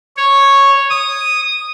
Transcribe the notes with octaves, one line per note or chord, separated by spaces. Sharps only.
C#5
D#6